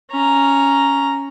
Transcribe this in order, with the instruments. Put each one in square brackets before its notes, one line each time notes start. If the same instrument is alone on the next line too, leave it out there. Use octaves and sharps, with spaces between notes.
[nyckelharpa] C#4 A#5